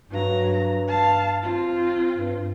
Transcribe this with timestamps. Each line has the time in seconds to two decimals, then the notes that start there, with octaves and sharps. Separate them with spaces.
0.10 G2 F#3 A#5
0.88 F5 A5
1.43 C4 F4
2.14 G2